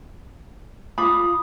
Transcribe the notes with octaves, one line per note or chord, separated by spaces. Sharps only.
F4 B5 D6 D#6